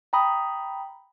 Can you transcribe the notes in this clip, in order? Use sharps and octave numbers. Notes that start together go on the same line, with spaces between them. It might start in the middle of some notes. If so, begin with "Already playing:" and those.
G5 A#5 B5 D#6